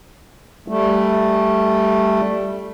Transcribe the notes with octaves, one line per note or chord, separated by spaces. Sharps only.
G3 A3